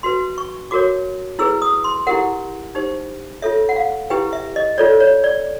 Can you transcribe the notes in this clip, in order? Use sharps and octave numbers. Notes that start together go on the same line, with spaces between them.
F#4 B4 C6
C#6
F#4 A#4 C#5 D6
E4 G#4 B4 E6
D#6
C6
E4 G4 A#4 F#5
D#4 G4 C5
F4 A4 C#5 E5
F#5
F5
E4 G4 B4 G5
E5
D#5
F4 A4 C#5 D5
C#5
D5